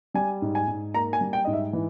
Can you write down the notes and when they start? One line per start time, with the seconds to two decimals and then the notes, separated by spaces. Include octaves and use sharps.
0.14 G3 G#5
0.42 G#2
0.55 G#5
0.68 G#2
0.94 A#3 A#5
1.13 G#5
1.21 G3
1.33 G5
1.45 G#2 D#5
1.53 E5
1.73 E3